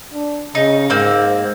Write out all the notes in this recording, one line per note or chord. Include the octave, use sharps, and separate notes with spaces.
D4
C#3 D#4
G#2 A#3 C4